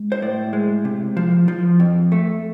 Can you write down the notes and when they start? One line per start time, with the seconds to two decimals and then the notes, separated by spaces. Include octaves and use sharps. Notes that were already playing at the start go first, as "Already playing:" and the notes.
Already playing: G#3
0.12 C5
0.22 A2 D5
0.53 G#3
0.85 C3
1.17 F3
1.48 F3
1.80 F2
2.12 A3